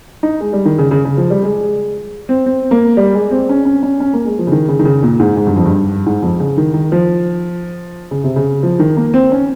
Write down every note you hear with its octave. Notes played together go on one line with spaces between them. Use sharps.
D#4
G#3
G3
D#3
C#3
C#3
C#3
F3
G3
G#3
C4
C4
A#3
G3
G#3
C4
C#4
C#4
C#4
C#4
A#3
G#3
F3
C#3
D#3
C#3
D#3
C#3
A#2
G#2
G#2
G2
F2
G2
G#2
F2
C#3
D#3
D#3
F3
C#3
C3
C#3
F3
D#3
A#3
C4
C#4